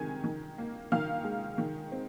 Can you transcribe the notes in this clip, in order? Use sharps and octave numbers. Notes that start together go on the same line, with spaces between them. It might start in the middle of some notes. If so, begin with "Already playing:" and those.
Already playing: C3 D#3 G#3 G#5 G#6
D#3
A#3
D#3 F5 F6
G#3
D#3
C4